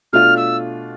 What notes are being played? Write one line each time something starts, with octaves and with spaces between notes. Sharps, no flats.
B2 A3 D4 F4 F6
E6